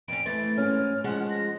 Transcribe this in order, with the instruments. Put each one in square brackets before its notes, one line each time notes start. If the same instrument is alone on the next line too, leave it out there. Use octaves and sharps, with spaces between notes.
[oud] F2 C#4 [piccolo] D7
[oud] E3 A3 C4 [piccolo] A6
[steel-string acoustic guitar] G#2 C#4 [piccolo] F6
[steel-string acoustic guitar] F3 G#3 [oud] C#4 [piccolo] F#5
[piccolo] A#6